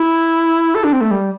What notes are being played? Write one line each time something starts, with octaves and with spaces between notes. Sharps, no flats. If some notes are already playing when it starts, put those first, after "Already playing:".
Already playing: E4
A4
D4
C4
A3
G3